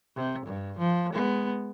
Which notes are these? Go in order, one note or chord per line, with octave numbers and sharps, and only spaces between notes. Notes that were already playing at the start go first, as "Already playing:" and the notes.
C3
G2
F3
G#3 B3